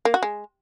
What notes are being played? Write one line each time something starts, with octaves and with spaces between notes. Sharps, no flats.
A#3
F#4
G#3